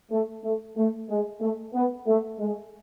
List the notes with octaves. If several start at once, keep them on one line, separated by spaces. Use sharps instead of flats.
A3
A3
A3
G#3
A3
B3
A3
G#3